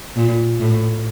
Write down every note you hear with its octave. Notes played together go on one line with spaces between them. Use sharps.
A#2
A2